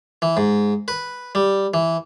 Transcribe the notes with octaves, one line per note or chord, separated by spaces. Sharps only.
E3
G#2
B4
G3
E3